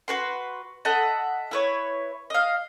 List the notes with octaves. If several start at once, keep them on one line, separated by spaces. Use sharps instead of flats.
F#4 B4 C6
A4 D#5 E5 F#5
E4 B4 C#5
D#5 F5